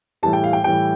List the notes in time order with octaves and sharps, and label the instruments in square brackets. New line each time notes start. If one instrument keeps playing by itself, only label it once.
[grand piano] A2 E3 G3 A5
G5
F5
G5
A2 E3 G3 G5